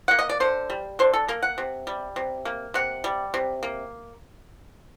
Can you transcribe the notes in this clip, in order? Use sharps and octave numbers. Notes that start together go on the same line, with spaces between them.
A#3 F#5
D#5
D5
D3 C5
G3
D3 C5
A4
A#3 A#4
F#5
C3
G3
C3
A#3
C3 F#5
G3
C3
A#3